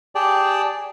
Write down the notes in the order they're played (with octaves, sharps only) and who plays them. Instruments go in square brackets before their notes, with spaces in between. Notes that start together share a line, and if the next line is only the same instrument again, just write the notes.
[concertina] G4 G#4 D5 G5 A5